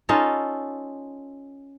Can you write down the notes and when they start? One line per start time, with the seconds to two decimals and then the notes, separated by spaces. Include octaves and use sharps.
0.09 C#4 D#4 F4 A4